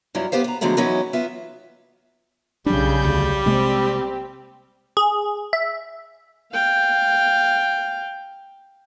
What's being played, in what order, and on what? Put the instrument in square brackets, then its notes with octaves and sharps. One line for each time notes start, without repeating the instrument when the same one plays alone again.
[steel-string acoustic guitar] G2 F#3 E4 F4
B3 G4 C5 F5
B3 A#5
D3 F3 F#3 G#3 A3 B3
E3 F#3 B3 C#4 D#4 E4
B3 F4 E5
[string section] B1 C#3 G6 [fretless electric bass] F#3 D4 [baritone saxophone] G3
[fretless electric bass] D2
[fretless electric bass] C3 G#3 A#3 [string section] C4 G4
[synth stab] G#4
E5
[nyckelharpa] F5 G5